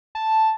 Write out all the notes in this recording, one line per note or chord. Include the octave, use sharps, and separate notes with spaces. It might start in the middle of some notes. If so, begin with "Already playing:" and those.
A5